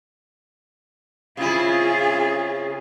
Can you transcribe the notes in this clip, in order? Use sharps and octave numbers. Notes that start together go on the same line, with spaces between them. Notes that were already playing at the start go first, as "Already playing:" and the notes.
C#3 C4 E4 F4 G#4